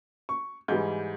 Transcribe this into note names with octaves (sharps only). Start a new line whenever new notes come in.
C#6
G#2 E3 G3 G6